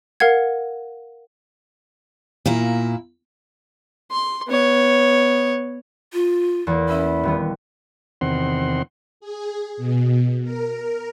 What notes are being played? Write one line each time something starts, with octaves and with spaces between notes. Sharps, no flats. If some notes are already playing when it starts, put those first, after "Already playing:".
A#4 F5 F#5 G#6
A#2 A#3 E4
C6
B3 C#5
F4
E2 A#3
C#4 E5 B5
D#1 G3 B3
E2 C3 D#3 C4 F#5 C6
G#4
B2
A#4